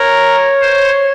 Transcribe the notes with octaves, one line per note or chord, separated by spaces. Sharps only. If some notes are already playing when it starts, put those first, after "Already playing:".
Already playing: A#4 C#5
C5